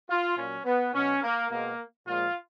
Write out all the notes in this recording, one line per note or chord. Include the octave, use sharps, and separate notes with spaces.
F4
A#2 F#3 C#4
B3
B2 F#3 C#4
A#3
B2 G#3 A#3
A#2 F3 G#3 F4